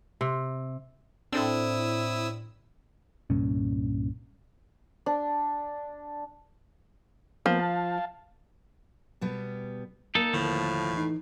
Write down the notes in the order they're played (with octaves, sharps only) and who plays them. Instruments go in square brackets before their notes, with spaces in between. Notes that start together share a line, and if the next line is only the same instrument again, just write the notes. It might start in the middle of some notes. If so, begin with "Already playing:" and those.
[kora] C3
[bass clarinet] A2 [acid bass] C4 [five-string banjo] D4 A4 [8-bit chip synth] E4 D#6 E6
[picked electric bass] C2 G2 A#2 C#4
[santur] D4
[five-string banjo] F3 [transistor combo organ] A#3 B3
[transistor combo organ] F5 A5
[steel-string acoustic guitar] B2 G3 B3
[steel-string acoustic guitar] A#3 [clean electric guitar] D#4 A4
[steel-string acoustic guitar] D#2 [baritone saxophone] A2 [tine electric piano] D3 [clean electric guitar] F3
[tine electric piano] E3 D#4